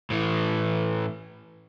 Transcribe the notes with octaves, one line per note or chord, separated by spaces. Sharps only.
A2 E3